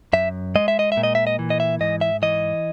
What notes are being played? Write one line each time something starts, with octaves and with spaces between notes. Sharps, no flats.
F#2 E5
G#3 D#5
E5
D#5
E5
A#2
D#5
E5
D#5
E3
D#5
E5
G#2 D#5
E5
E3 D#5